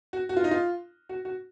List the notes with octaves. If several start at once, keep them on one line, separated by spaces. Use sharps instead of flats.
F#4
F#4
F4
D#4
F4
F#4
F#4